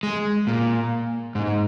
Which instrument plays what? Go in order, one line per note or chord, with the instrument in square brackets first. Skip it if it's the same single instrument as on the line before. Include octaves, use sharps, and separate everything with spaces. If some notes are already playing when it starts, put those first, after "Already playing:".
[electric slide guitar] G#3
A#2
G#2